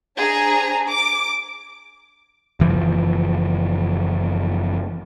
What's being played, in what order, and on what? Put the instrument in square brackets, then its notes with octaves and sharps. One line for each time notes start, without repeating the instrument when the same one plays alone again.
[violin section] D4 G#4 C5 A#5
D6
[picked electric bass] F#1 E3 F3